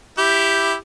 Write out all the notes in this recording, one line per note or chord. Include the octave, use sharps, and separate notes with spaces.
E4 G4